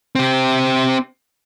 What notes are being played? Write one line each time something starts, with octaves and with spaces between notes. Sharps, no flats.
C4 G4